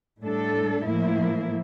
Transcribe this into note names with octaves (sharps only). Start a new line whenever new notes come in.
A2 G3 D4 A4
A2 F3 A#3 E4